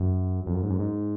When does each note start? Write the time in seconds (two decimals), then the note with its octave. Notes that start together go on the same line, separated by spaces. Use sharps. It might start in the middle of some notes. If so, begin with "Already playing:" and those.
Already playing: F#2
0.46 F2
0.54 F#2
0.63 G#2
0.70 F#2
0.79 G#2